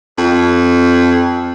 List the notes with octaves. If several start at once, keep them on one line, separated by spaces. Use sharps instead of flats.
F2